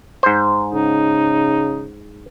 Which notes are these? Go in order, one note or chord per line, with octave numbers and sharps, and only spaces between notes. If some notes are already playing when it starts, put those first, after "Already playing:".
G#2 C5
C#3 D#4